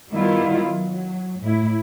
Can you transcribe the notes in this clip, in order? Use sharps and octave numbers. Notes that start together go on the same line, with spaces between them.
D#3 G3 B3 E4 F4
F#3
F#3
A2 E4